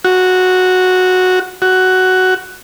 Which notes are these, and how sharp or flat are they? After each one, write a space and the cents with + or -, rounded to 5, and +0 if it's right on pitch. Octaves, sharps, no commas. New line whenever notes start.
F#4 -5
F#4 +10